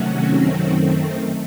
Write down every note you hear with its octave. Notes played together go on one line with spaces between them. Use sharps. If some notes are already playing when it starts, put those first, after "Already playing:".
Already playing: C3 D#3 F#3 A3 C#4 F#4
F#2 D#3 A3 C4